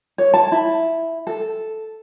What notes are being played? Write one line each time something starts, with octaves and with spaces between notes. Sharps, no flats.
C#5
A5
E4
A4